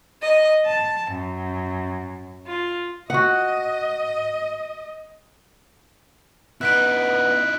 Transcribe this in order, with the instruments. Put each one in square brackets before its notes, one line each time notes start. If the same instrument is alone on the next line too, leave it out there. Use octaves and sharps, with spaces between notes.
[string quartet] D#5
A5
F#2
F4
[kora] F#4 F#5 [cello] D#5
[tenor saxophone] B3 [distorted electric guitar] D#4 E4 [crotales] F#6 B6 D7